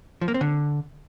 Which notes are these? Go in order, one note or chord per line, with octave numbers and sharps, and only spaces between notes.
F3
A#3
C4
D3